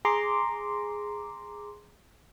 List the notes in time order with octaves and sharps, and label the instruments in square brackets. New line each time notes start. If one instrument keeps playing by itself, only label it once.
[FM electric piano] G#4 A#5 C6 D6